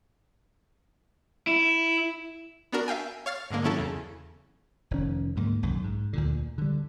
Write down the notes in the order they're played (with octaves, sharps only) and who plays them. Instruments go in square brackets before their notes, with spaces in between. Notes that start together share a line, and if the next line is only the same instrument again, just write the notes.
[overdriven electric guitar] E4
[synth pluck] B3 D4 F#4 A#4
E5 F5 G5 G#5
C#5 F5 F6 A6
G#2 D3 G#3 A#3
D#3 F#3 C#4 E4 A4
E2 C#3
[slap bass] F1 D#3 C#4
D2 G#2 G#3 A#3
B1 F#2 A2 D#3
G#2
D2 A#2 D3
D3 G3